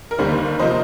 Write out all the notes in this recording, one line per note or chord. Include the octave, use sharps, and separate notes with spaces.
A#4
D#2 D3 G3 A#3 C5
C3 F3 A#3 C5 D#5